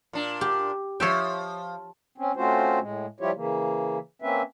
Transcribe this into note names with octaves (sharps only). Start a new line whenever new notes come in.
A#2 D4
G4
F3 C#5 E5 G5
C4 C#4
A3 C4 C#4 F4 F#4 C5
A2 G#3
F3 G3 E4 F4 G4 C#5
C#3 E3 A#3
A#3 C4 C#4 B4 E5